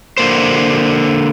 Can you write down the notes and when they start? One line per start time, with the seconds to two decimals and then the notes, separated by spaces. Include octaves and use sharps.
0.18 D3 A#3 C5